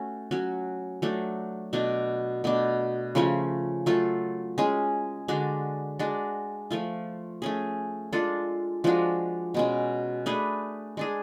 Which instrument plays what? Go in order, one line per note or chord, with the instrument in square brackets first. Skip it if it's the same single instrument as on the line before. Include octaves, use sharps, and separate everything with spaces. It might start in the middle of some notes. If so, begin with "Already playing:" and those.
Already playing: [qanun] A3 C#4 F#4 A4
F#3 C#4 F#4
F#3 A3 D4
B2 A3 D4
B2 A3 D4
C#3 F3 A3 C#4
F#3 A3 F4 A4
G#3 C#4 G#4
D3 G#3 D4 F#4
G#3 D4 F#4
F3 A3 F4
A3 C#4 G#4
G#3 D4 F4 A4
F3 G#3 D4 F#4
B2 G#3 C#4
A3 D4 G#4 B4
G#3 D4 G#4